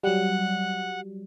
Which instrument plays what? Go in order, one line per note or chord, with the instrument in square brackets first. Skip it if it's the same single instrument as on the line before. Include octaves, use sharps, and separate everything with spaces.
[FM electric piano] F#3 G3 [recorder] F#5